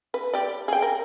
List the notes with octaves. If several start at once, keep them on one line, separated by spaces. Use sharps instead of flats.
B4
G4 D5
G#4 G5
A#4